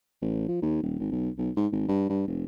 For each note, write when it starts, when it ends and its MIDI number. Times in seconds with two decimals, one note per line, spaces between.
0.22 0.46 33
0.48 0.61 53
0.62 0.80 39
0.83 0.99 27
1.00 1.09 32
1.11 1.29 35
1.38 1.50 35
1.56 1.67 44
1.72 1.83 32
1.88 2.05 43
2.09 2.24 43
2.27 2.45 29